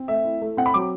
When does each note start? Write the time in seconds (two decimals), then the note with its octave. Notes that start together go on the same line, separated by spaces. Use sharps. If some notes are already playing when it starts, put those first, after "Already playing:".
Already playing: C4
0.08 A3 E5
0.25 E4
0.42 A3
0.57 C4 F#5
0.66 B5
0.74 F#3 D6